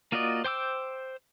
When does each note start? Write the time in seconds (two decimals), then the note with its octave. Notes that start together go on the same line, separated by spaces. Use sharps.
0.12 A#3 F4 F#4 D5 D#5
0.44 C5 G5 D6 E6